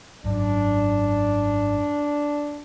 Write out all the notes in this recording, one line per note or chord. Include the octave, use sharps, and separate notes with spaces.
G#1 F#2 D4